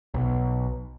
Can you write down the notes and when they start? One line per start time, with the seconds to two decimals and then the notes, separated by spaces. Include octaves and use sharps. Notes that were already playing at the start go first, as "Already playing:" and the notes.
0.14 B1